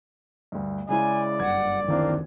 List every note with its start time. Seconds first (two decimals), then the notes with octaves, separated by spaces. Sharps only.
0.52 D2 G2
0.89 C#3 G#3 E4 D5 G#5
1.40 F#1 G2 F#5 G#6
1.88 F#1 D2 D#3 E3 A#3 C4 D4